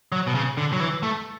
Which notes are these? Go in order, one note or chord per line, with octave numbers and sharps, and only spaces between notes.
F#3
B2
C#3
D3
F#3
E3
A3